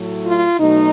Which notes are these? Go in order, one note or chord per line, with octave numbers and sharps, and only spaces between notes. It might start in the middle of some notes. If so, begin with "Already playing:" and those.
Already playing: A2 F#3 A3
F4
B2 F#3 A3 D#4